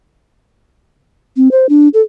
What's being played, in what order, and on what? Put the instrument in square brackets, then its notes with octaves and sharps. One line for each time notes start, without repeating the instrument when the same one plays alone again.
[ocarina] C4
C5
D4
A4